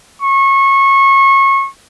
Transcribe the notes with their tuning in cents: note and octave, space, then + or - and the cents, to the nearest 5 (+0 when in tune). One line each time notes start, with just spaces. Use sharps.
C#6 -25